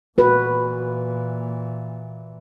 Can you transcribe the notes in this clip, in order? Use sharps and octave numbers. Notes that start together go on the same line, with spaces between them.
A#2 E3 F#4 B4